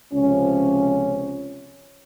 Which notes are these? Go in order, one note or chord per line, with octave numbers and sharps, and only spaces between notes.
C#2 C3 F3 C#4